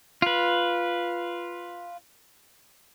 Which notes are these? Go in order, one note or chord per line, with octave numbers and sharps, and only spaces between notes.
F4 B4